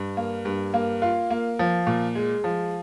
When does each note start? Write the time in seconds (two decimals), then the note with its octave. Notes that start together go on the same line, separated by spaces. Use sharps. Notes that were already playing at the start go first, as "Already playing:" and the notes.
Already playing: G2
0.17 A#3
0.45 G2
0.74 A#3
1.02 F4
1.30 A#3
1.59 F3
1.87 A#2
2.15 G#3
2.44 F3